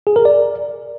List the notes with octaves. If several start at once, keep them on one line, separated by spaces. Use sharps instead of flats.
G#4
A#4
D5